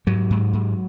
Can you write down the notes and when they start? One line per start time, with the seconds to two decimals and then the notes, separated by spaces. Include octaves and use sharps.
0.07 G#2 F#3
0.30 G#2
0.53 G#2